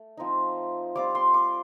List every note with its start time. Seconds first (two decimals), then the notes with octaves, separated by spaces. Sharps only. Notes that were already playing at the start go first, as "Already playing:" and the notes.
Already playing: A3
0.17 F3 C4 D#4
0.95 G3 C4 F4 D6
1.15 C6
1.34 D6